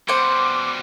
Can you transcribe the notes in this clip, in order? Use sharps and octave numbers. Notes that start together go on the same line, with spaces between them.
B2 G3 C5 F#5 D6